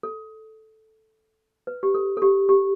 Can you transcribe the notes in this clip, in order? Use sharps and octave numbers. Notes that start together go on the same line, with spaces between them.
A4
B4
G4
A4
A4
G4
G4